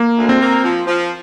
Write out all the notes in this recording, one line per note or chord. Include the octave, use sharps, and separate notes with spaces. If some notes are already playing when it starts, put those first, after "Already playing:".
Already playing: A#3
D2
C4
A#3
F3
F3